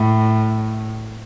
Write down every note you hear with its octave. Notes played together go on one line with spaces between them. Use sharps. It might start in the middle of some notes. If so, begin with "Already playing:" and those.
Already playing: A2